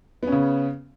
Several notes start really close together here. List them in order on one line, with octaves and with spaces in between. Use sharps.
B3 C#4 C#3